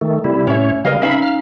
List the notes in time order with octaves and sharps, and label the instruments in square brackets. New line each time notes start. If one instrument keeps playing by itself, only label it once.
[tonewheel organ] D#3 A3
C3 G3 E4
[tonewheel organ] A2 C#5 [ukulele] C#4 E5
[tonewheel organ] C#3 G3 [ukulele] A#4 D#5 F5
[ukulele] C#4 D#4 F5 [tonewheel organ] E5 B5
[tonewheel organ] F6